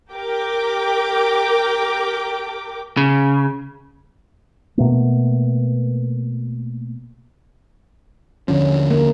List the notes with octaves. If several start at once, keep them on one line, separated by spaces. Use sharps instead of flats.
G4 A#4 G5 D6
C#3
B2 A3 A#3
D#2 D3 F3 C#4
A#3